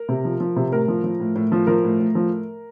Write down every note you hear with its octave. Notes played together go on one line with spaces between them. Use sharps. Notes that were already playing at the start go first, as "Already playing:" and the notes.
Already playing: A#4
C3
F3
F3
C3
A2 A#4
F3
F3
A2
A2
F3
F3 A#4
A2
A2
F3